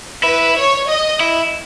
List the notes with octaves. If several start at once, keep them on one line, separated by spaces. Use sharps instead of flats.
E4 B4
C#5
D#5
E4